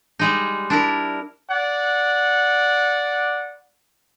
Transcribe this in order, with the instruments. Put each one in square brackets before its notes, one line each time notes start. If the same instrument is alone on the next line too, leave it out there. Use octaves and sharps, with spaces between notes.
[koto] G3 G#3 D#4
D4 E4 A#4
[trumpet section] D5 F#5